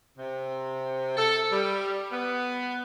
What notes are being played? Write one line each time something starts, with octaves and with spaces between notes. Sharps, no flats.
C3
A4
G3
B3